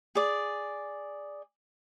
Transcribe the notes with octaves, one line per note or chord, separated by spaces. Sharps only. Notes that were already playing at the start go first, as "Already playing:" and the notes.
G#4 D5